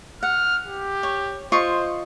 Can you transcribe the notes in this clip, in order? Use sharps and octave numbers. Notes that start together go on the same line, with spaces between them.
F#5 F6
G4
C#5
F4 C5 D#5 C#6